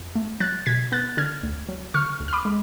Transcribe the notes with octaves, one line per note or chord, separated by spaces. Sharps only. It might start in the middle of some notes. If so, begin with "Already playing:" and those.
Already playing: F2
A3
F#3 F#6 A6
B2 G#6 B6
B3 F#6 A6
D3 F6 G#6
D2
F#3
D3 C#6 F6
D2
F6
B5 D6
G#3